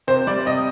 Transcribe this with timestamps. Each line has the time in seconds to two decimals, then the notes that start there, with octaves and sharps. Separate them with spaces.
0.07 C3 C5
0.27 G3 D5
0.46 C3 D#5